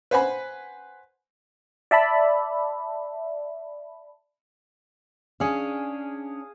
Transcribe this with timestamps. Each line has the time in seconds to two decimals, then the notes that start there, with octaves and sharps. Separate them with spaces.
0.11 B4 C5 F#5 G#5 B5
1.91 D5 E5 A5 B5
5.40 C#4 D4 G#4 F5